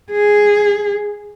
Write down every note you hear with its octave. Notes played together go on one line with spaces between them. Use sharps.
G#4